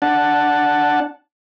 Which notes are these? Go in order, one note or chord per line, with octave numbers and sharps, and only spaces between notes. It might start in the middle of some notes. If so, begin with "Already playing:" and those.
D4 F#5 A5